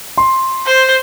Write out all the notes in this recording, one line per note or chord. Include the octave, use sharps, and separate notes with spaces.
C6
C5